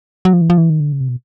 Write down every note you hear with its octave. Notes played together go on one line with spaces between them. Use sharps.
F#3
F3
E3
F3
E3
D#3
D3
C#3
C3
B2